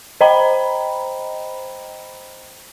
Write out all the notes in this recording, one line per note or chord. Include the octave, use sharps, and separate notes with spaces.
C5 D#5 G5 A#5 B5